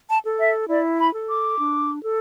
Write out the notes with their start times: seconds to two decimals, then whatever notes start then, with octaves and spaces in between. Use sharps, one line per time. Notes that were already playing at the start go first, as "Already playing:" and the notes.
0.09 A5
0.25 A4
0.39 E5
0.68 E4 D5
0.98 B5
1.13 A4
1.27 D6
1.58 D4
2.03 A4